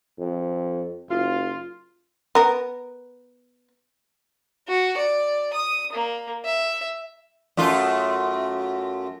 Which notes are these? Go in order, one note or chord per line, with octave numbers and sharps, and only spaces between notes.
F2
F#1 F4
B3 A#4
F#4
D5
D#6
A#3
E5
F#2 A3 F4